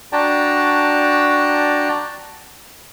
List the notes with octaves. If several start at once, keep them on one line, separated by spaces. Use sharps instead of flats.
D4 F#4 D5 G5 A5 A#5